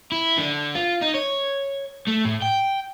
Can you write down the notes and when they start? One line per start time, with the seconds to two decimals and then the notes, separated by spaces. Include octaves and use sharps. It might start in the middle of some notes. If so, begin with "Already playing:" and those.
0.12 E4
0.38 D3
0.75 F4
1.02 D#4
1.14 C#5
2.08 A3
2.25 A2
2.42 G5